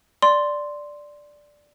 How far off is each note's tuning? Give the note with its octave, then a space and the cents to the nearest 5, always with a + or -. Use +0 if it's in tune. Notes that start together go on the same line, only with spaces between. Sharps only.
D5 +0 C6 +0